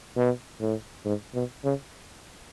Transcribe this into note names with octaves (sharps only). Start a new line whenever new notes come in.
B2
A2
G#2
B2
C#3